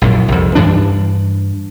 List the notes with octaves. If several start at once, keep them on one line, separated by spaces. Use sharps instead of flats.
A#1 F#2 A2
C2 F2
G2 E3 D4